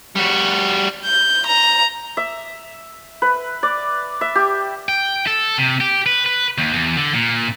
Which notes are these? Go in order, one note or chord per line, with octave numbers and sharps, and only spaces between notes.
G3 F#4
G6
A#5
E5
B4
D5
E5
G4
G5
A4
C3
G4
B4
B4
D#2
E2
D3
A#2